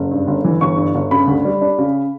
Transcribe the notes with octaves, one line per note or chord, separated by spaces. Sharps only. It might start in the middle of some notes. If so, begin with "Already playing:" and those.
Already playing: F#1
G2
G1
E3
G1 C#6
G2
G1
C#3 B5
D2
G3
D4
C#3